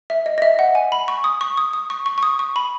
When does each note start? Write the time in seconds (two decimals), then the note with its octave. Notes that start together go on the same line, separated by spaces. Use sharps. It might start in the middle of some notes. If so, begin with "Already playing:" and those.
0.10 E5
0.26 D#5
0.38 D#5
0.42 E5
0.59 F#5
0.75 G#5
0.92 B5
1.08 C#6
1.24 D#6
1.41 C#6
1.57 D#6
1.73 D#6
1.90 C#6
2.06 C#6
2.18 C#6
2.23 D#6
2.39 C#6
2.56 B5